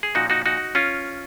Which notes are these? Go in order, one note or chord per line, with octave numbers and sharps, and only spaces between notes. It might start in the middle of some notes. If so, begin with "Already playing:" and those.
G#4
A#2 F3 D#4 F#4
D#4 F#4
D#4 F#4
C#4 F4